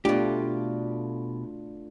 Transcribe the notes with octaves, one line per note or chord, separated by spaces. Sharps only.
B2 A3 D4 F4 G4